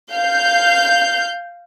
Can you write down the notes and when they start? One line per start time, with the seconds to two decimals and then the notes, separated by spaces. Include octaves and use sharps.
0.12 F5 G6